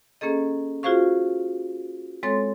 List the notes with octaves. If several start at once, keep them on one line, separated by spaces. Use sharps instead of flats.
A#3 C#4 G#4 A4 D#5
F4 F#4 G#4 C5 F5 C#6
G#3 C4 A4 C#5 C6 A6